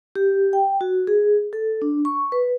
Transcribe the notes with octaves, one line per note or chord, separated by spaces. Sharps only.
G4
G5
F#4
G#4
A4
D4
C#6
B4